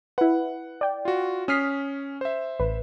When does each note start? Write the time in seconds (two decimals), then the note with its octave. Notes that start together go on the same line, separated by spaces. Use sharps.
0.18 E4 B4 F#5
0.81 D5 G5
1.05 F4 F#4
1.48 C#4 D#6 F6 B6 C7
2.21 C5 E5
2.59 A1 B4